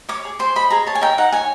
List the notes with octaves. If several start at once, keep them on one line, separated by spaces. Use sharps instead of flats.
C#5 D6
G#4
C5 C6
D#5 B5
G#4 A#5
C#5 A5
G#5
D#4 G5
D#4 F#5
C#5 G#5